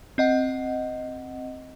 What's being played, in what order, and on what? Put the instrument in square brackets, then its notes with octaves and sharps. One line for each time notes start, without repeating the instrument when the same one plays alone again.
[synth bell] C4 D#5 F#5